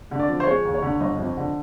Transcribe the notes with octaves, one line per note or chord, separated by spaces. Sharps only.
D3
D5
F3
C5
G#3 C#5
D#2
C#5
D3
G1 D#5
F2
D3